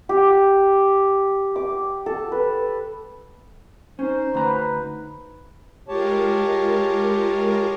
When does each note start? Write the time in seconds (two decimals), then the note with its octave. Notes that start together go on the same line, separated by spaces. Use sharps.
0.09 G4
1.56 D6
2.06 A4
2.32 B4
3.99 C#4 D#4 C5
4.34 D2 B4 A#5
5.88 G#3 F4 G4 A#4 C#5 A5